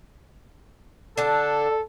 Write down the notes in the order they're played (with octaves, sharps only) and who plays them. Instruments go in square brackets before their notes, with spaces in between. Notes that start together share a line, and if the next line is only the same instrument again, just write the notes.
[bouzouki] D3 D4 [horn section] A4